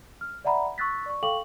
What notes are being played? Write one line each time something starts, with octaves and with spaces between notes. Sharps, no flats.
F6
D5 E5 F#5 A#5 B5
C#6 E6 F#6 A6 B6
D5 C#6
A4 F5 G5 C#6 D6 F#7